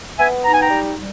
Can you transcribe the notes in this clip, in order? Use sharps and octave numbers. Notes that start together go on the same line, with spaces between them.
B3 E5 G#5
D#4 A#5
G#5
G5 A#5
G3
G3